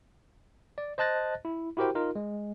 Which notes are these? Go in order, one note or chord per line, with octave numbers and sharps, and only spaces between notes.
D5
C5 D#5 A5 F#6 A6 A#6
E4
E4 F#4 G4 A#4 C5 G5
D#4 F4 A#4
G#3